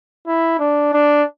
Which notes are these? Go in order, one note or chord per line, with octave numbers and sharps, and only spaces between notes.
E4
D4
D4